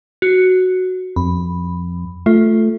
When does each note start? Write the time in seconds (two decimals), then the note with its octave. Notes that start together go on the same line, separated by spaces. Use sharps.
0.22 F#4
1.16 F2 B5
2.26 A3 F4